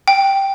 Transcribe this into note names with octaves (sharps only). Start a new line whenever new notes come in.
G5